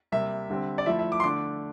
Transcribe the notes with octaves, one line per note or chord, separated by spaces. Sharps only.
C3 G3 A#3 E5
D3 G3 C4
D5
F3 A3 E4 E5
E5
D6
C6
D3 A3 D4 D6